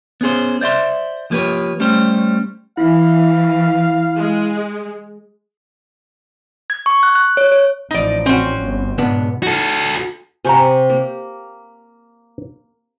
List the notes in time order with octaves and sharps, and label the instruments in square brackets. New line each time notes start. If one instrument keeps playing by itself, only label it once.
[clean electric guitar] B3 C#4 G#4 C5
C5 D5 E5 C6
F3 A#3 G4 B4 C#5
G3 A3 C#4 G4 C5
[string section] E3 [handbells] E4 [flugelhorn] F5
[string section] G#3
[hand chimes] G#6
C#6
F#6
F#6
C#5
C#5
[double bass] A1 F3 [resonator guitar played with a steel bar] D#4 D5
[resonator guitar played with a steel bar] C4 F#4 [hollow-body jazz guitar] C#4
[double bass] G1
[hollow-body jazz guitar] C#2 B3 D4 [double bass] G#2 B2
[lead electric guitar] F#4 A4
[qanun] C3 G4 C#6 [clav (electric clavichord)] G#5 A#5
[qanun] A#3